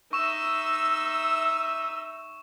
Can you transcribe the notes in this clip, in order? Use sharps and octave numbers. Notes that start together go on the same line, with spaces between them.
D#4 E5 C#6 E6 E7